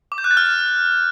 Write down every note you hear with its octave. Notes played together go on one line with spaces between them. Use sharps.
D6
G6
F#6
A6
F6